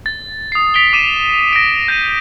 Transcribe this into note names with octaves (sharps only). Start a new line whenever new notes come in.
A6
D#6 C7
B6 D7 F7 G7
D6 D#7 E7
A#6 D7
G6 A#6 D#7